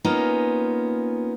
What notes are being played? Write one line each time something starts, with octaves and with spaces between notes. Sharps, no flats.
A#3 B3 C#4 D#4 F4